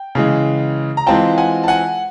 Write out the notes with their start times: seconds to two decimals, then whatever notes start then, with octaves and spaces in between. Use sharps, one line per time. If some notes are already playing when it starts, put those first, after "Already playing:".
Already playing: G5
0.15 C#3 E3 G#3
0.97 A#5
1.07 E3 G#3 C4 F4 G5 A5
1.38 F#5 G#5
1.64 A5
1.68 F#5 G#5